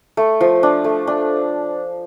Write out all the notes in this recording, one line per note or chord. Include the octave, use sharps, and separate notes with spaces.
A3
F3
D4
A3
D4